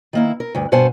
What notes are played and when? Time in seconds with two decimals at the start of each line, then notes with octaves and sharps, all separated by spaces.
0.13 D#3 A#3 E4
0.40 A#4
0.55 D2 G2
0.72 G2 B2 C5 F#5 G#5 A5